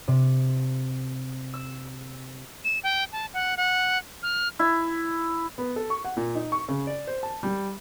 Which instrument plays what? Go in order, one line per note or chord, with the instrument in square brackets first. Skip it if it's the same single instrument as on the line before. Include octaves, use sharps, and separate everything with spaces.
[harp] C3
E6
[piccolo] E7
G5
A5
F#5
F#5
F6
[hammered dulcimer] E4
[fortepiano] B3
A4
C#6
F#5
A#2
D#4
C#6
C#3
D5
C5
A5
G3